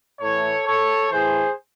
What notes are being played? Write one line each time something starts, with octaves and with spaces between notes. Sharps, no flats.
A2 E3 A4 C#5
A4 C#5
A2 E3 G#4 C5